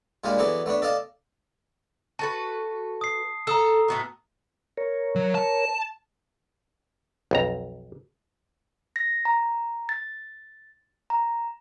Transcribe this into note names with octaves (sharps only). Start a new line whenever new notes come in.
A#2 G3 G#3 D4 F5 G#5
E3 F#3 B3 G#4 A4 D5
A3 B3 D4 C#5
A4 D5 D#5 F5 A5
F#4 A4 B4 A5
D#6 C7
A4 A#5 D#6 E6
A2 B3 F#4
A#4 C#5
F#3
A5
B1 F2 A#5
A#6
A#5
A6
A#5